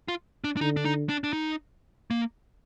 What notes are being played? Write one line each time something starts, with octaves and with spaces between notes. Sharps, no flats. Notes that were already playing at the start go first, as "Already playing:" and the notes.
F4
D4
D4
D3 D#4
D4
D#4
D4
D4
D#4
A#3